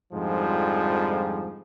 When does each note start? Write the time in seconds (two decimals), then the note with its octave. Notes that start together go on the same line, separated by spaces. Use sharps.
0.13 F2 G#2 D3 F3 G3